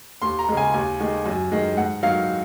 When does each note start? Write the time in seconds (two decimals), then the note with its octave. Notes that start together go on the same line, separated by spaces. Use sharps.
0.22 D#2 C6
0.39 A#5
0.49 C#3 G#3
0.57 G#5
0.74 D#2 G#5
1.00 D#3 G#3
1.26 F#2
1.52 D#3 G#3
1.77 G#2 F#5
2.03 D#3 F#3 F5